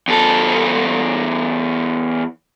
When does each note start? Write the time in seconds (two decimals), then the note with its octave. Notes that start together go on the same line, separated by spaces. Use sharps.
0.08 E2 A4